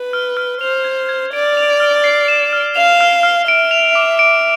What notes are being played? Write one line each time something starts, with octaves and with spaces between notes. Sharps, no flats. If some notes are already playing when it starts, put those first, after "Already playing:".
Already playing: B4
F6
F6
C5 F7
G#6
G#6
D5 D7
F7
F6
C7
E7
F6
F5 F7
F6
F6
E5 D7
F7
D6
D7